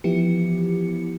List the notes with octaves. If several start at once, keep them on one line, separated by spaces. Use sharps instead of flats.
E3 F3 B3 E4 G4 C#7